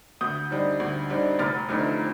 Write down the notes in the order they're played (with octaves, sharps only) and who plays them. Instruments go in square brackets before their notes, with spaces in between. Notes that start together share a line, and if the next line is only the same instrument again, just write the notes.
[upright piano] D2 D#6 G6
D3 G3 C4 D#4
D2
D3 G3 C4 D#4
F1 F6 A6
F2 D3 A3 D#4